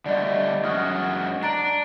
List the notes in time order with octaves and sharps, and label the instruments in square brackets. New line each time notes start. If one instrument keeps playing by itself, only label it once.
[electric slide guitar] D3 G3 A3 [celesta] D5 D#5
[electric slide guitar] F#2 G#3 F#4 [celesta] D#6 F6
[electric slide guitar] D4 [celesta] A#5 A6 D7